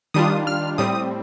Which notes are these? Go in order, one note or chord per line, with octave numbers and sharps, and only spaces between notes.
D#3 G3 D4 F4 D#6
F6
A2 G3 C4 D#6